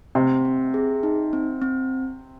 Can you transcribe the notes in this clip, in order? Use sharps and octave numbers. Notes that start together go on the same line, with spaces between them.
C3 C4
C4
G#4
D#4
C4
C4